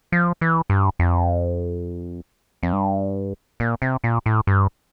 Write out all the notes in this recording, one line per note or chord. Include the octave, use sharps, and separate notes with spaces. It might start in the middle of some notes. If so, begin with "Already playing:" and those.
F3
E3
G2
F2
F2
G2
A#2
C3
A#2
A2
G2